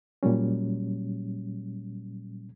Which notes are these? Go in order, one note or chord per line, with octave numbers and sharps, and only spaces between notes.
A#2 F#3 G3 C#4